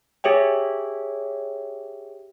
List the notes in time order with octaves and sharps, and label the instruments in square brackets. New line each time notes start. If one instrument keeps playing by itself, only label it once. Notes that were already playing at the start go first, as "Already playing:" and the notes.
[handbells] G4 G#4 C#5 E5 G5